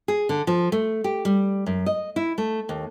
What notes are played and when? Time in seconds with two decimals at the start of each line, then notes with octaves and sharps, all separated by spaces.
0.08 G#4
0.29 D3
0.47 F3
0.72 A3
1.04 G4
1.25 G3
1.66 F#2
1.86 D#5
2.16 E4
2.38 A3
2.69 D#2